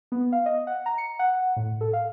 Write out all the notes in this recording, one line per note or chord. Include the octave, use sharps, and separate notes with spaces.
B3
F5
D#5
F#5
A#5
C#7
F#5
A2
A4
F5